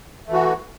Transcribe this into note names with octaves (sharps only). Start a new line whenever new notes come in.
E3 A3 F#4